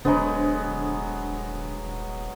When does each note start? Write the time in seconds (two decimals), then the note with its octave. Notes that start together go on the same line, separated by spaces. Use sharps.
0.05 D#1 D3 F#3 G#3 B3 C5